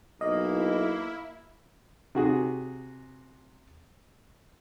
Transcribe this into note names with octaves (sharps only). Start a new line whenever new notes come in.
B1 A#3 E4 D#5
C3 F#4 G#4